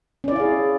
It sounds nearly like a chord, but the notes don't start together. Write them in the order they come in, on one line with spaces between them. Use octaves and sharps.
C#4 D5 E4 F5 G#4